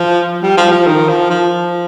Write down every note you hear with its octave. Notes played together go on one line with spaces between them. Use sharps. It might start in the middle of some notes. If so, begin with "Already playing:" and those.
Already playing: F3
G3
F3
F3
D#3
F3
F3